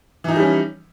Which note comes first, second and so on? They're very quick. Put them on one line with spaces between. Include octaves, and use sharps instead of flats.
E3 D#4 F3 G3 C#4